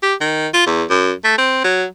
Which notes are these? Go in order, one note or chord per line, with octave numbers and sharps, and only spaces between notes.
G4
D#3
F4
E2
F#2
A3
C4
F#3